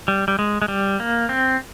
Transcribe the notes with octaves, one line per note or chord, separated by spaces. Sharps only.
G3
G3
G#3
G#3
G3
A#3
C4